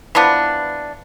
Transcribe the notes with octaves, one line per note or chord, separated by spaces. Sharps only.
E3 F3 B3 D4